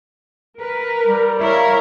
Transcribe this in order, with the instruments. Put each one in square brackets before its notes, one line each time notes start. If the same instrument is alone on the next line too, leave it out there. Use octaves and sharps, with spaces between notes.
[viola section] A#4 [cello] B4
[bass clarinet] G3
[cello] E4 A#4 [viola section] C#5 F5